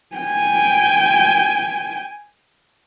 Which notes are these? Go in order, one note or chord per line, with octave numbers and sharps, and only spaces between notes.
G5 G#5